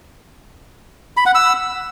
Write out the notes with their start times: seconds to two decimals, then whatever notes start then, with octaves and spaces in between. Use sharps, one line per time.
1.17 B5
1.26 F#5
1.35 E6